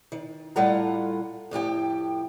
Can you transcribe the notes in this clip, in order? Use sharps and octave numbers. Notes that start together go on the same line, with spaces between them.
D#3
A2 G3 F4 A4 F#5 A#5
F2 A2 G4 G5